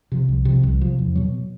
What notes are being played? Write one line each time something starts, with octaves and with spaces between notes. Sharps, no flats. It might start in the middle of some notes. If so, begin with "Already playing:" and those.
C3 F3
C2
C3 F3
C2
C3 F3
E2
B2 F#3